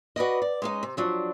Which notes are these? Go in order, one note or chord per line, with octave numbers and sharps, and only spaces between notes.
F#4 B4 D5 D#5
D5
G#3 C#4 D#4
C3
F3 F#3 D4